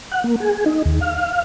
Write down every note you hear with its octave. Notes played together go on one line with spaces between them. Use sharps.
F#5
A#3
G#4
D#4
D#2
F5